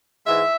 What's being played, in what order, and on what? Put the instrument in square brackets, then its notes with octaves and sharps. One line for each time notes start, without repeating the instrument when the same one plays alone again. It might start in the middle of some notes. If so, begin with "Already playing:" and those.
[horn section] G#2 E3 G#3 E5